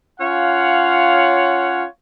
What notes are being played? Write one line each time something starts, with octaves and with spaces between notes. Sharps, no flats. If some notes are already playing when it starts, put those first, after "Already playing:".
C#4 F4 C#5 F5 F#5